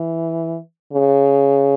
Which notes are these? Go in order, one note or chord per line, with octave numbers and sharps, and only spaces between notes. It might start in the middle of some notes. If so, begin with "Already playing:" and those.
Already playing: E3
C#3